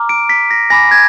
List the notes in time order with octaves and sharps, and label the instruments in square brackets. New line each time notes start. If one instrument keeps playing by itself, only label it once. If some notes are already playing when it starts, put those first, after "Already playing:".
Already playing: [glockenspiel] A#5 D6 F6
D7
B6
A#6
G#5 B5 D6 A#6
G#6